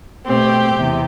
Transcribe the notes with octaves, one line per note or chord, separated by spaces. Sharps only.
B2 A3 C4 G4
E2 C3